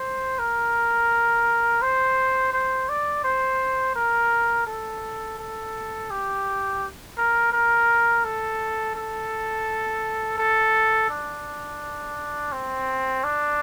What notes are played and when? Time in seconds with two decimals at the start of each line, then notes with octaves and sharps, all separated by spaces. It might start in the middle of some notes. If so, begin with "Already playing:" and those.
Already playing: C5
0.39 A#4
1.82 C5
2.53 C5
2.89 D5
3.24 C5
3.96 A#4
4.67 A4
5.38 A4
6.10 G4
7.17 A#4
7.52 A#4
8.24 A4
8.95 A4
10.38 A4
11.10 D4
12.52 C4
13.24 D4